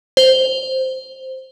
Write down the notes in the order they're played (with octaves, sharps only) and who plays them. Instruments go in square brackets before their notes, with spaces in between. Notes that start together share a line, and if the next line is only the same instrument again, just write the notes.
[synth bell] C5